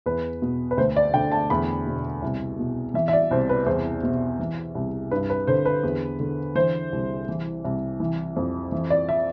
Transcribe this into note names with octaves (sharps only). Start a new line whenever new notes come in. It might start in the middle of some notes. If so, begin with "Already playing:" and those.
E2 B4
B2
B4
D2 C5
D5
D3 G5
A5
E2 B5
B2
C2
B2
E3 E5
E5
D5
C2 C5
B4
E2 C5
B2
E3
C2
G2 B4
B4
D3 C5
B4
E2
D3
E3 C5
C2
E3
C2
E3
F2
E3
D5
E5